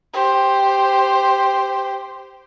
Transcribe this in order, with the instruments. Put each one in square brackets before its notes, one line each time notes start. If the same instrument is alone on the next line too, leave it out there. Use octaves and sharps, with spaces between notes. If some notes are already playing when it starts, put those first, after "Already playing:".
[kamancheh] G4 C5